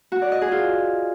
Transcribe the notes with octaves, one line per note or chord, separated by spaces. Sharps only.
F#4
D5
D#5
G#4
F4